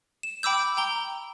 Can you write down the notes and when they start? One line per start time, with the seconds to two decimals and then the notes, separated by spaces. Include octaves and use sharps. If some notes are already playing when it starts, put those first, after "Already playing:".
0.23 E7
0.43 G5 B5 D6 E6 G6
0.77 G5 A#5 G7